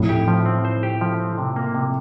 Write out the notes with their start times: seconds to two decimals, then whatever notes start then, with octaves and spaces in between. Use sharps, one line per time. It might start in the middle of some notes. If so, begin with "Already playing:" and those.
Already playing: F2 A2
0.09 G4
0.28 F3
0.46 C4
0.65 C5
0.83 G4
1.01 F3
1.20 C4
1.38 C3
1.56 A#3
1.75 C3